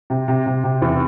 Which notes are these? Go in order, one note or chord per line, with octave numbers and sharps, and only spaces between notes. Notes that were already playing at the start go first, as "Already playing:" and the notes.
C3
C3
C3
C3
E2